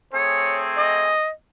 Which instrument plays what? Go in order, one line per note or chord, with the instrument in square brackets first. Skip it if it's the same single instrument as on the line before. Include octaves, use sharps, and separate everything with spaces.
[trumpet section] A3 C4 G#4 [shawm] C#5
[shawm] D#5